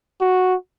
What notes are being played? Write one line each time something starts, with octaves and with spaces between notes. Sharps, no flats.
F#4